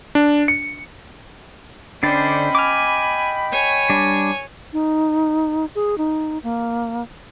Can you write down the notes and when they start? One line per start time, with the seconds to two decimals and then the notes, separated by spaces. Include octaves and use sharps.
0.15 D4
0.48 C#7
2.03 D3 C#4 D4 C5 D5 D#5 G5 B5
2.55 G#5 D6 F6
3.52 C#5 G#5
3.90 G3 D4
4.73 D#4
5.75 G#4
5.98 D#4
6.43 A#3